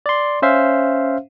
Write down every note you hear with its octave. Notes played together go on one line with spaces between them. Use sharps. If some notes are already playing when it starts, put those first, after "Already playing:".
D5 C6
C#4 C5 E5 F5